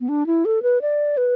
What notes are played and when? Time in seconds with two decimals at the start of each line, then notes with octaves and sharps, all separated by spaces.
0.01 B3
0.09 D4
0.27 E4
0.45 A4
0.63 B4
0.82 D5
1.17 B4